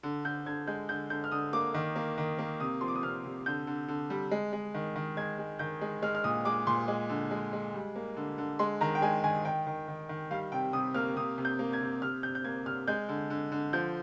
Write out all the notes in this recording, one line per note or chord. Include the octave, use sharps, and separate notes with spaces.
D3
D3 G6
D3 G#6
G#3 G6
D3 G6
D3 G6
F6
D3 D#6
A#3 D6
D#3
A#3
D#3
A#3
C3 D#6
F3 C6
D6
D#6
C3 F6
C3
D3 G6
D3
D3
G3
G#3
G#3
D#3
D#3
G#3 G#6
G#3
D#3 G6
G#3
G#3 F6
F6
A#2 D#6
G#3 D6
A#2 C6
G#3
D3
G#3
G#3
G3
A#3
D3
D3
G#3 C6
D#3 A#5
G5
G#3 G#5
D#3 G#5
D#3 G5
D#3
D#3
D#3
G3 F5
C3 G5
C3 D#6
A#3 F6
C3 D#6
C3
G6
A#3
G#6
C3
C3 F6
C3 G6
G6
A#3 G#6
C3 F6
G#3 G6
D3
D3
D3
F3 G6